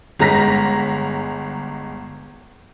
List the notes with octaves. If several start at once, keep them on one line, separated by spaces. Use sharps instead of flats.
G1 G#3 A#5 A#6 B6